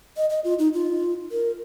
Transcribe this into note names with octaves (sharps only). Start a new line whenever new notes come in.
D#5
D#5
F4
D#4
F4
A#4